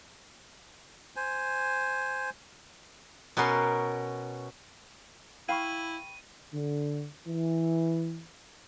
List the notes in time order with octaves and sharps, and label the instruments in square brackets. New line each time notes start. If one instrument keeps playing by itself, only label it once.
[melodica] C5 G#5
[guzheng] B2 B3 C#4 A#4 C6
[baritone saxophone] E4 [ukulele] F5 [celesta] G5 B5 C#6 [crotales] D#7
[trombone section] D3
E3